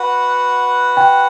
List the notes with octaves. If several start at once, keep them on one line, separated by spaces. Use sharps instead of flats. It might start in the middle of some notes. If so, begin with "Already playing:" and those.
Already playing: F#4 B4 F#5
G5